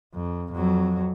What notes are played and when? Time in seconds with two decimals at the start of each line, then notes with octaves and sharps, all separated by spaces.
0.15 F2
0.52 F2 F#3